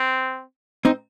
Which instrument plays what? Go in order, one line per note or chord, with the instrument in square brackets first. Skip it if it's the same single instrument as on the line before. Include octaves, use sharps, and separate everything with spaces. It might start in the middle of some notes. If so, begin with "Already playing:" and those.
Already playing: [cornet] C4
[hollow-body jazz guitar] C4 D#4